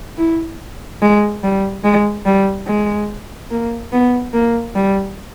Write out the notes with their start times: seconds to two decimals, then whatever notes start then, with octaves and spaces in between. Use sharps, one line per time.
0.18 E4
1.02 G#3
1.43 G3
1.84 G#3
2.26 G3
2.67 G#3
3.51 A#3
3.93 B3
4.33 A#3
4.76 G3